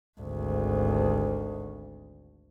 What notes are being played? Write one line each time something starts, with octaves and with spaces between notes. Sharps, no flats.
G#1 D2